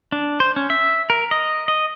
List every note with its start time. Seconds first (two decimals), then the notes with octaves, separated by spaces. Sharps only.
0.12 D4
0.40 C5
0.56 C#4
0.70 E5
1.10 A#4
1.31 D#5
1.68 D#5